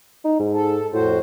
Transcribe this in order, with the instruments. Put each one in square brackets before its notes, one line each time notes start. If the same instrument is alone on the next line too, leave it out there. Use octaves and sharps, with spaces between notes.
[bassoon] D#4
G#2
[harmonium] A4
[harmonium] F2 F#4 C5 [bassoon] A2